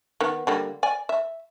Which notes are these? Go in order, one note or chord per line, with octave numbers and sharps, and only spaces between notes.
D#3 B3
D3 G3 A#3
D5 G#5
E5